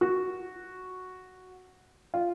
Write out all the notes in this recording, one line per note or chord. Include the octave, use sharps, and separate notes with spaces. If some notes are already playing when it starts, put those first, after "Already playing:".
F#4
F4